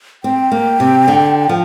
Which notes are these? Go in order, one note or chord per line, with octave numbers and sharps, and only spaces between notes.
C4 G5
A#3
C3
D3
F3